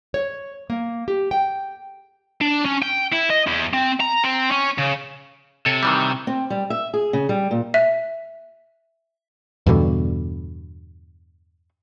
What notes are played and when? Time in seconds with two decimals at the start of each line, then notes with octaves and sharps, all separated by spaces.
0.14 C#5
0.70 A#3
1.08 G4
1.31 G5
2.41 D4
2.65 C#4
2.82 G5
3.12 E4
3.30 D#5
3.47 E2
3.73 C4
4.01 A#5
4.24 C4
4.51 C#4
4.78 C#3
5.66 C3 A4 C#5
5.83 D#3 E3 G3
6.27 C4
6.50 G3
6.70 E5
6.94 G#4
7.13 C#3
7.29 G3
7.51 A#2
7.74 E5
9.66 E2 G2 B2 D3